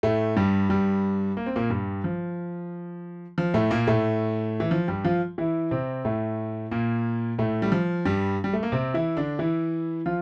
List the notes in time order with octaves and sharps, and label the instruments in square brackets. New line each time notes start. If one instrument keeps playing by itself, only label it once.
[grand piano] A2 A3
G2 G3
G2 G3
A#3
C4
A#2 A#3
G2 G3
F3
F3
A2 A3
A#2 A#3
A2 A3
E3
F3
G2 G3
F3 F4
E3 E4
C3 C4
A2 A3
A#2 A#3
A2 A3
G3
F3
G2 G3
G3
A3
A#3
C3 C4
E3 E4
D3 D4
E3 E4
F3 F4